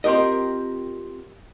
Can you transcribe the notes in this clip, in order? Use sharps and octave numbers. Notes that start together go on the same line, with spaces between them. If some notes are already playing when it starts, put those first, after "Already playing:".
C4 F4 G4 A#4 D#5